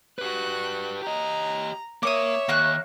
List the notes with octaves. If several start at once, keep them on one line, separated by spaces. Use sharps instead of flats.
F#4 G4 B4 F#6
G4 D#5 A#5
A#3 A#4 C#5 E5 D6 D#6
D#2 A#3 C#6 F#6